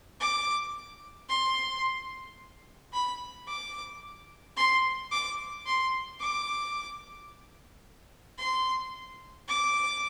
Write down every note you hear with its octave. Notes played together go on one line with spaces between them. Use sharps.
D6
C6
B5
D6
C6
D6
C6
D6
C6
D6